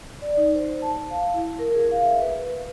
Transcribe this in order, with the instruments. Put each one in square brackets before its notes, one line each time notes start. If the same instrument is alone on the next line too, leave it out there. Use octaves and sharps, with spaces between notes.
[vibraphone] D5
D#4
C5
A5
F5
E4
A#4
G#4
F5
E5
B4